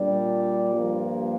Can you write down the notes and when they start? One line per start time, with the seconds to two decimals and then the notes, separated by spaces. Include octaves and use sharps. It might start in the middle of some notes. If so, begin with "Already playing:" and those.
Already playing: A#2 G3 D4 D5
0.75 G2 F3 A#3